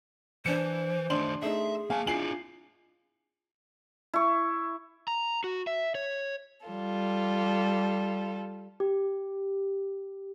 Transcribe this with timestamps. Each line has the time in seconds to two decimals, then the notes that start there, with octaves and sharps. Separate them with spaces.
0.46 E3 D4 C5 C#7
1.10 D#3 A3 D4 C6 F#7
1.42 A3 D#4 G#4 E5
1.90 A#3 F5 G#5 A5
2.07 D4 E4 F4 G#5 C7 F#7
4.14 E4 C#6
5.08 A#5
5.44 F#4
5.67 E5
5.95 C#5
6.66 G3 F4 A4
8.80 G4